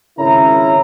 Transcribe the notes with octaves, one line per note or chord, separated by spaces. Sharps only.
G#1 C#3 E4 A#4 C#5 A#5